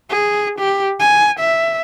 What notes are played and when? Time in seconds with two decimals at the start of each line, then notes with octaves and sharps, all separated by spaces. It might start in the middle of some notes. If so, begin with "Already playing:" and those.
0.10 G#4
0.59 G4
1.00 G#5
1.39 E5